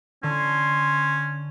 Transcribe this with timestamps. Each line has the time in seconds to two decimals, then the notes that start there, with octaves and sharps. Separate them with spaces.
0.23 D3 C#4 C6